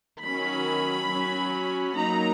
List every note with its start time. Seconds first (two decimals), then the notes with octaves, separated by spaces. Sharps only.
0.22 D#3 F#3 C#4 B5
1.08 F#3 C#4
1.95 F#3 A#3 D#4 A#5